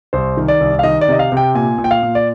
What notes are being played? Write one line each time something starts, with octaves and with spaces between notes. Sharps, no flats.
C2 C5
D#3
D5
C2
F5
D#3 D#5
D5
C3 D#5
F5
C3 G5
A#2 G#5
A#2
G5
F5
A#2
D5